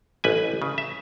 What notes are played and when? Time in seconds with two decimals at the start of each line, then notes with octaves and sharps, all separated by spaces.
0.24 A1 B4 G#5
0.62 C#3
0.78 E5